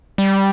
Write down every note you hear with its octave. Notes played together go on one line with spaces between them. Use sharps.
G3